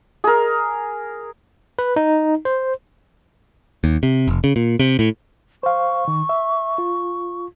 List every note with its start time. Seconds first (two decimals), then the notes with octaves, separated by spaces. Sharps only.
0.24 G#4 A#4
1.79 B4
1.96 D#4
2.45 C5
3.84 D#2
4.03 C3
4.28 F1
4.44 C#3
4.56 A#2
4.80 C3
4.99 A2
5.63 C5 F5 C#6
6.08 D#3
6.29 E5
6.78 F4